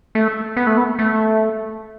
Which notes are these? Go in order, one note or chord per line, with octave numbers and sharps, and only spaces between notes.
A3
B3
A3
B3
A3